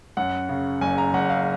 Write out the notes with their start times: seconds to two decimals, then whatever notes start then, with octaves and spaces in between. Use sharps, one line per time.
0.17 F#2 F#5
0.49 C#3
0.81 F#1 G#5
0.98 A#5
1.14 F#1 F#5
1.30 F5